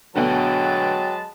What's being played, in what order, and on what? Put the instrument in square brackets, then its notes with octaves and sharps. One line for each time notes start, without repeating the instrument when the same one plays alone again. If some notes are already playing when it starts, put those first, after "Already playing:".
[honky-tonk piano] D2 B2 D3 [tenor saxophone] F#3 [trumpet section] G#3 B4 A5 [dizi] G5